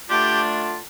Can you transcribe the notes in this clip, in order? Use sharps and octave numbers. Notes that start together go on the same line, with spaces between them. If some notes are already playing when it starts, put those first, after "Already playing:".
D3 A3 D4 F4 G4